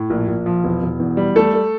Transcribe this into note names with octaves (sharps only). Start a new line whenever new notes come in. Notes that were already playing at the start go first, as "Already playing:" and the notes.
Already playing: A2
A#1
A#1
F3
E1
E1
E2
G3
A3 A4
A3